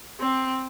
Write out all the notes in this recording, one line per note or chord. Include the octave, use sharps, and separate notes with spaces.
C4